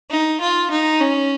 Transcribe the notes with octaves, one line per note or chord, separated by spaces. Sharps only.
D#4
F4
D#4
C#4